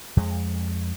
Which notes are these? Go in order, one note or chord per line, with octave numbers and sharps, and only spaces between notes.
F2 G#3